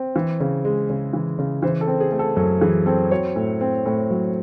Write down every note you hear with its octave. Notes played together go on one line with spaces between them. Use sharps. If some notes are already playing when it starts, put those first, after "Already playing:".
Already playing: C4
E3
C#3
G#3
C#3
E3
C#3
E3 C5
A4
C4
G#4
A3
A4
F#2 A4
E3 G#4
C4 A4
F#3 C#5
A2
C4
A2
F#3